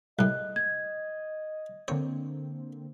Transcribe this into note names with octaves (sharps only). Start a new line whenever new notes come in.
C2 A2 D#5 F#6
G#6
D3 A#3 C4 C#5